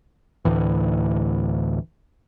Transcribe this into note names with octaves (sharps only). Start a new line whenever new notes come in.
D2 A2 E3